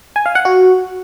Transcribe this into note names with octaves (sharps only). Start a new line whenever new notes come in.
G#5
F5
F#5
F#4